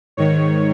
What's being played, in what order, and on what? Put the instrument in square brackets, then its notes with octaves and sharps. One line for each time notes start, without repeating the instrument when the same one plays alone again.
[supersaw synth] G#2 D#3 C#5